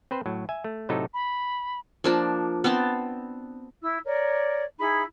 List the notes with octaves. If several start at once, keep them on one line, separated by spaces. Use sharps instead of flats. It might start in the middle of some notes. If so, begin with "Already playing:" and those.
C4 B4 C5
A2 F#3
E5 G#5
A3
A2 C3 F#3 A3 D#4 A4
B5
F3 A#3 D4
B3 C4 C5 A5
E4 E6
A#4 C#5 D5
D#4 E4 G#4 B5